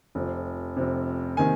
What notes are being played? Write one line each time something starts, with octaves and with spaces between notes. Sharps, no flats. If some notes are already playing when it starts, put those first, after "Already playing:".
F1 F2 C3
F1 F2 C3
C3 D#3 A#3 G#5